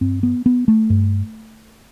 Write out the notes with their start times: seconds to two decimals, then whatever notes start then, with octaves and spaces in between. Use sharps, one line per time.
0.01 G2 C4
0.23 B3
0.46 B3
0.68 A3
0.90 G2